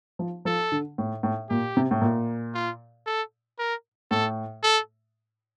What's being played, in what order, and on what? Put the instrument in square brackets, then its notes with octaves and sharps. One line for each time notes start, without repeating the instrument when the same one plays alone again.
[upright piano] F3
[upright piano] F3 [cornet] A4
[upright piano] D3
A2
A2
[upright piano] A#2 [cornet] G4
[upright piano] C3
A2
A#2
[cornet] F4
A4
A#4
[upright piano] A2 [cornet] A4
[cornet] A4